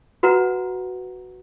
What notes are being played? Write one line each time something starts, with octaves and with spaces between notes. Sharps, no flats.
F#4 B4 F#5 A#5